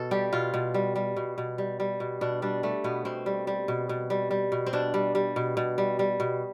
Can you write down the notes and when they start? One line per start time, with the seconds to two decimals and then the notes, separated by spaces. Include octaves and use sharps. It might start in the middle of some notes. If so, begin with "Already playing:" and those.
Already playing: B2 A4
0.11 G3 G4
0.33 B2 F4
0.54 B2
0.74 G3
0.96 G3
1.17 B2
1.38 B2
1.58 G3
1.80 G3
2.00 B2
2.21 B2 D4
2.42 G3 D4
2.63 G3 A3
2.84 B2 B3
3.05 B2 C4
3.26 G3
3.47 G3
3.68 B2
3.89 B2
4.10 G3
4.31 G3
4.52 B2
4.66 C4
4.73 B2 D4
4.94 G3
5.15 G3
5.36 B2
5.57 B2
5.78 G3
5.99 G3
6.20 B2